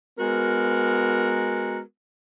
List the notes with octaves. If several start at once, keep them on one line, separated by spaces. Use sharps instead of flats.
G#3 B3 F#4 A#4